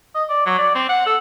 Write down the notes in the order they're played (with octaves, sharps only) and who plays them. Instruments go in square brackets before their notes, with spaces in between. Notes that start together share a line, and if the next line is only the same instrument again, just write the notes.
[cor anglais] D#5
D5
F#3
D5
C4
F#5
A4